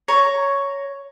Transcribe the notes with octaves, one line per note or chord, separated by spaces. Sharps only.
C#5 A#5